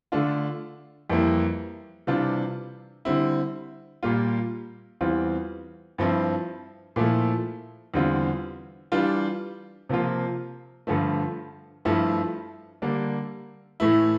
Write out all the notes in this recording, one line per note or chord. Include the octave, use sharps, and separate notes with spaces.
D3 A3 D4 F4
F2 E3 G3 A#3 E4
C3 E3 G3 D4 F4
D3 G3 C4 E4
A#2 G3 A#3 F4
E2 E3 G3 C4 F4
G2 F3 C4 E4
A#2 F3 A3 E4
E2 D3 G3 C4 F4
E3 G3 D4 F4
C3 F3 A#3 F4
G2 D3 F3 A3
G2 F3 A3 E4
D3 G3 A#3 D4
A2 E3 A3 E4